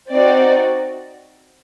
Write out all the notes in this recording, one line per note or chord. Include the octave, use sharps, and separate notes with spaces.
C4 D#4 F#4 D5